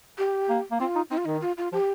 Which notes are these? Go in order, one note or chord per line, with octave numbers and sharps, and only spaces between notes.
G4
A#3
A#3
C4 F4
D#4
C4 D#4
F4
D#3 D#4
F4
F4
F3 G4